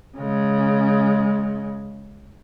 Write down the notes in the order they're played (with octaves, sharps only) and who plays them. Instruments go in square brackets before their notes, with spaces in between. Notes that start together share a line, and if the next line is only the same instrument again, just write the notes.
[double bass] C#3 G#3